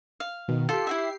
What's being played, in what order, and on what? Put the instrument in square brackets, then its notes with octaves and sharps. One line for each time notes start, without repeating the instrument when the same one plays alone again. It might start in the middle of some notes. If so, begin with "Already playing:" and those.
[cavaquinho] F5
[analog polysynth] B2 D#3
[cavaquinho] F4 A4 [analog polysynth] G4 C7
[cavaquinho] E4 F#4 E5